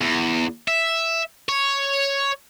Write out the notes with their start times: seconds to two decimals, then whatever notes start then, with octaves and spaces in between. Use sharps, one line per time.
0.01 E2
0.68 E5
1.49 C#5